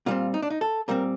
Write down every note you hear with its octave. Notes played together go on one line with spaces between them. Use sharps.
A#2 G3 C4 F4
D#4
D4
D#4
A4
A#2 G3 C4 A#4